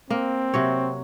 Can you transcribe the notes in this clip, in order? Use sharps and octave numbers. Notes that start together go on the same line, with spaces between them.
A#3 C4
C3 F#3 C#5